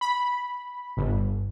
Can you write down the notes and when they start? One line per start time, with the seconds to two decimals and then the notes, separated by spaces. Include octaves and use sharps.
0.01 B5
0.97 G1